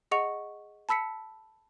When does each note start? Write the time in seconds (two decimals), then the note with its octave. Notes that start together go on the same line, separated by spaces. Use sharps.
0.11 G#4 D#5 F#5 C#6 C#7 F7
0.89 A5 B5 E6 B6 C#7